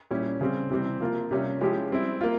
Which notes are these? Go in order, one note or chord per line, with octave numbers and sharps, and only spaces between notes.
A#2 G3 C#4 E4 G4
C#3 G3 C4
C3 E3 G3 C4
F3 A#3 F4
C3 G3 C#4 F4
F3 G#3 C#4 E4 G4
G3 C4 E4
A#3 F4